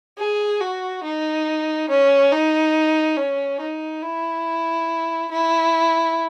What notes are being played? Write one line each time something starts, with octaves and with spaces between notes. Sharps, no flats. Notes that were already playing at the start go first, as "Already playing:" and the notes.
G#4
F#4
D#4
C#4
D#4
C#4
D#4
E4
E4